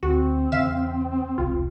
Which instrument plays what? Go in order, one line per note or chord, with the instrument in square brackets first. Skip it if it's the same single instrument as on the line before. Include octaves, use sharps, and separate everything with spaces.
[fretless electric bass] D2 [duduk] C4 [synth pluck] F#4
[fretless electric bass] E2 C#3 [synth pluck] E5 F5 E7
[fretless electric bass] E1 C2 [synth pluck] F4